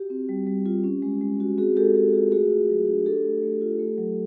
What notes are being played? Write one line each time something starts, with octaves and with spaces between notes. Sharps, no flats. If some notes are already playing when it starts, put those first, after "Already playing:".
Already playing: F#4 G4
C4
G3
G3
F4
C#4
G#3
G#3
F#4
C4 F#4 G#4
G#3 G4 A4
G#3 G4
F4 G4
A3 F#4 G#4
F4
F#3
D4 G4
D4 G4 A4
A3
A3
F4
A3
F#3